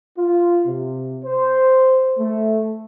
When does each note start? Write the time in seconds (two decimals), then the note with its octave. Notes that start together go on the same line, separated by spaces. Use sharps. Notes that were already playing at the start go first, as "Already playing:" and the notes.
0.18 F4
0.66 C3
1.24 C5
2.18 A3